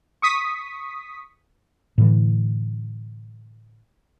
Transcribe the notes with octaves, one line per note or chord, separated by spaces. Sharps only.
C#6 D#6 B6
A2 D3 E3